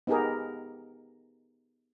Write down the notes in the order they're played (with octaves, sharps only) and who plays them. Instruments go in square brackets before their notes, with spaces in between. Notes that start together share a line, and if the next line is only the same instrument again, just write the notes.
[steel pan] B3 D#4 G4 G#4 A#4